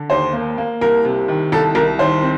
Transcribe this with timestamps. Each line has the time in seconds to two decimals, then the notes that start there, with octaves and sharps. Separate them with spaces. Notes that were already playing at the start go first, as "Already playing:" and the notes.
Already playing: D3
0.10 D#2 C5
0.33 A#3
0.58 A#3
0.81 C2 A#4
1.05 C3
1.28 D#3
1.52 C2 A4
1.75 C2 A#4
1.99 D#3 C5
2.22 C4